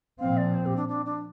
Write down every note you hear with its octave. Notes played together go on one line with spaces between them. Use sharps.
A#2 F3 C4 F5
D5
C5
G4
D4
D4
D4